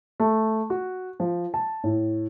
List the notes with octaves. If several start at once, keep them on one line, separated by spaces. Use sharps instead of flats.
A3
F#4
F3
A5
A2